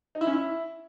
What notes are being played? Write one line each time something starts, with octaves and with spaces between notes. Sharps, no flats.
D#4
E4
C#4
E4